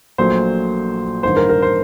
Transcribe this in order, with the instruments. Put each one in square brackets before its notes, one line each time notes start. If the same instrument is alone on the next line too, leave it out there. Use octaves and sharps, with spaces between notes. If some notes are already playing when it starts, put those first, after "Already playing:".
[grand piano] A#1 A#2 F#3 A3 C5
A1 G2 D#3 C5
A#4
A#4
C5